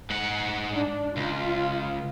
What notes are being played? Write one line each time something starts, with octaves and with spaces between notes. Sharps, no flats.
G#2 F#5
D4
C#2 F4